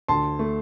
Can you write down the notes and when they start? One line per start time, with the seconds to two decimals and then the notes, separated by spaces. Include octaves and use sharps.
0.08 D2 A5 C6
0.39 A3